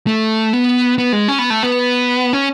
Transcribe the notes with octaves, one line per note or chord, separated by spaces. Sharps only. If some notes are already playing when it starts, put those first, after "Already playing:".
A3
B3
B3
G#3
C#4
B3
A3
B3
C#4